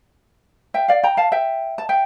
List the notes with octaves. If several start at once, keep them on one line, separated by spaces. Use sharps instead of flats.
E5 G5
D5 F5
G5 A#5
F5 A5
E5 G5
A5
E5 G5